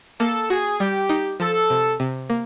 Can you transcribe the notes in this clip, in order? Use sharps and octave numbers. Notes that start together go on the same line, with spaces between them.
A#3 A4
F#4 G#4
G3 G4
D#4
F3 A4
C3
C3
A#3